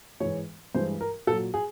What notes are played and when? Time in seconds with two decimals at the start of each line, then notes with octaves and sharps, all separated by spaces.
0.20 G#2 E3 G#3 C#5
0.75 G2 E3 G#3 C5
1.01 A#4
1.27 A#2 A4
1.31 F#3
1.54 G#4